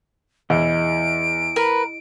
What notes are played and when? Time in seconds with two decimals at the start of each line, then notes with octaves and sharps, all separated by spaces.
0.50 E2 E4 G#4 D#5 D7
1.56 A#4 B4 B5